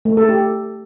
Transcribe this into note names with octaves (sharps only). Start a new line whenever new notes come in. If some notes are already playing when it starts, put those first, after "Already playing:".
A3
A4
G4